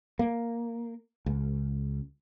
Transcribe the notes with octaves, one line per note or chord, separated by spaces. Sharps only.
A#3
C#2